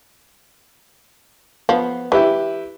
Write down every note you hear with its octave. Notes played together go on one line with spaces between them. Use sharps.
F3 B3
E3 E4 G4 B4